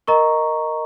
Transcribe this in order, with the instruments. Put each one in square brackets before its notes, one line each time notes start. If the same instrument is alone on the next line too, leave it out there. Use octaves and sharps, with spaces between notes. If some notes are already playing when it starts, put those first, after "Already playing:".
[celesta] A#4 D#5 A#5 C#6